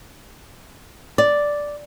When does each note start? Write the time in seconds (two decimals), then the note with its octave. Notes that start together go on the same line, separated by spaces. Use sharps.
1.18 D5